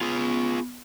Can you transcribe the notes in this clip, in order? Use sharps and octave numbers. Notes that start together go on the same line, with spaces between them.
B3 F4 G#4